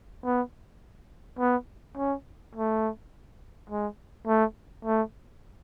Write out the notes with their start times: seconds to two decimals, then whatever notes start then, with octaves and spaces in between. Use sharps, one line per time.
0.24 B3
1.39 B3
1.97 C#4
2.55 A3
3.70 G#3
4.27 A3
4.85 A3